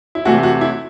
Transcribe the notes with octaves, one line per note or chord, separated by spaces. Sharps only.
E4
C3 E3 A3 F#4
F#4
E4